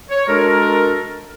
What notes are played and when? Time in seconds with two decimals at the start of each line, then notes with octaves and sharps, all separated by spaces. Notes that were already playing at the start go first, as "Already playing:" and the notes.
0.10 C#5
0.28 G#3 D4 F#4 A4 A#4